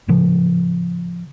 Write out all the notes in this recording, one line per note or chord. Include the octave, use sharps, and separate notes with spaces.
A2 C#3 F3